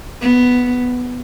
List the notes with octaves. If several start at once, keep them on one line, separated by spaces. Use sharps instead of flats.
B3